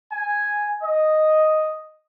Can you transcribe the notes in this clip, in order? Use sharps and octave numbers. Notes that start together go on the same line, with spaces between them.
G#5
D#5